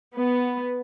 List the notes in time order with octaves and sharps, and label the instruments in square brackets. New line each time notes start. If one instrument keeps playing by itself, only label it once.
[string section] B3